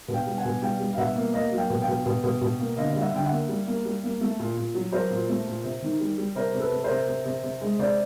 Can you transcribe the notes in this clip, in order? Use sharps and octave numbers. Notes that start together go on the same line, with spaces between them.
B2
F5 G5
G3
F#5 G#5
B2
G3 F5 G5
G3
F5
B2 E5 F#5
A#3
A#3 D#5 F5
F#3
F5 G5
B2
F5 G5
B2
B2
B2
B2
A#3
D3 D#5 F5
F5
G3
E5 F#5
D3 G5
E5 F#5
A#3
G3
A#3
G3
A#3
A3
A#2
A#2
F#3
F#3 A#4 C5
A#2
A3
A#2
C3
D#3
G3
G3
C3 A#4 C5
C3
A4 B4
C3
A#4 C5
C3
C3
C3
C3
G#3
C3 C5 D5